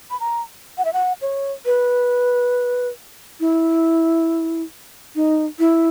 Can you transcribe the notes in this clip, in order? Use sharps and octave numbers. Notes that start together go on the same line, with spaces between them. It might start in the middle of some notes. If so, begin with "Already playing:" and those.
B5
A#5
F#5
E5
F#5
C#5
B4
E4
D#4
E4